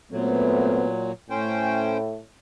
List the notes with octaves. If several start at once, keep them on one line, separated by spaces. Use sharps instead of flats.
A#2 F#3 A3 B3 C4
A2 C#4 C5 G5